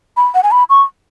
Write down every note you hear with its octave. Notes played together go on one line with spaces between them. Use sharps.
B5
F#5
G#5
B5
C#6